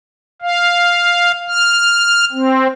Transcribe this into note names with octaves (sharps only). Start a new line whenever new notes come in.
F5
F6
C4